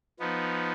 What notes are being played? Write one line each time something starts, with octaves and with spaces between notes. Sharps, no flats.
F3 B3 D#4